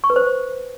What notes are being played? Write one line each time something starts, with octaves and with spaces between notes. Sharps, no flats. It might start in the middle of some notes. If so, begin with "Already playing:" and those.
C#6
B4
C5